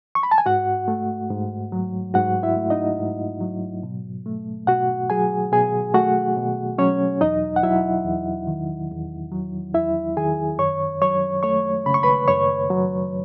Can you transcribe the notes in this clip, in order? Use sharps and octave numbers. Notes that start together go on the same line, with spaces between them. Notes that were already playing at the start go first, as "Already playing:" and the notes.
C#6
B5
A5
G#5
G#2 F#4 F#5
A3
G#2
F#3
G#2 F#4 F#5
E4 E5
A3
D#4 D#5
G#2
F#3
B2
A3
B2 F#4 F#5
F#3 G#4 G#5
B2 G#4 G#5
A3 F#4 F#5
B2
F#3 C#4 C#5
E2 D#4 D#5
F#5
F#3 E4 E5
E2
D#3
E2
F#3
E2 E4 E5
D#3 G#4 G#5
F#2 C#5 C#6
F#3 C#5 C#6
A3 C#5 C#6
C#3 B5
C#6
B4 B5
F#2 C#5 C#6
F#3